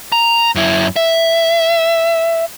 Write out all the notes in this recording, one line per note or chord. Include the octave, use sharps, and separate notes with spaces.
A#5
F#2 E4
E5